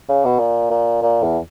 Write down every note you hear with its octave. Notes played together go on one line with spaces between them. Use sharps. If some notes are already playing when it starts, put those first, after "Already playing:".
C#3
B2
A#2
A#2
A#2
E2